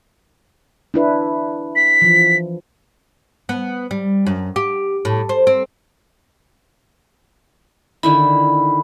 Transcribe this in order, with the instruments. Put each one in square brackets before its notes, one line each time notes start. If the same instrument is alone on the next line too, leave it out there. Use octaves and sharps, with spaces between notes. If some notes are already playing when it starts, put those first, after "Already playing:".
[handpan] D4 E4 B4
[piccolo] B6
[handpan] E3 F3
[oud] B3
G3
F#2
G4
A2
C5
C4
[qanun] D3 D#3 E4 [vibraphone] B5